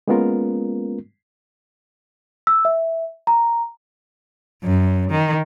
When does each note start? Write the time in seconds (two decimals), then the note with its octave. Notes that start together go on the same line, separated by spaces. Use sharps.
0.08 G#3 A#3 B3 C#4 F4 A#4
2.47 E6
2.65 E5
3.27 A#5
4.64 F#2
5.11 D#3